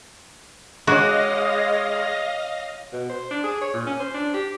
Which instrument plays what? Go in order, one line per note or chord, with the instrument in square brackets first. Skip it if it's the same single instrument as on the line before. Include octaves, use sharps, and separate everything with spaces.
[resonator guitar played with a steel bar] G#3 [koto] F#4 [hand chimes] C#5 D6 [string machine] D#5 F5 A#6
[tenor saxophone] B2
C5
D4
G#4
C#5
A#2
C#4
C5
D4
G4